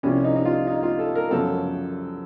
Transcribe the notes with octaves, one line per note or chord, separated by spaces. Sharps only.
C2 C3 F3 C#4
D#4
D#4
F4
D#4
F4
A4
A#4
F#2 C#3 F3 A4